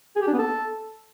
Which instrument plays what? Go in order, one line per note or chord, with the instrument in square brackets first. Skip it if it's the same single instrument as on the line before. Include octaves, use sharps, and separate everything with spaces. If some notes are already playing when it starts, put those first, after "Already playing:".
[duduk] G#4
G4
D4
B3
A4